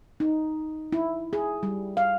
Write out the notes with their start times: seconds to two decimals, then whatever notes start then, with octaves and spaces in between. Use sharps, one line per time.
0.20 D#4
0.92 E4
1.33 G#4
1.63 G3
1.97 F5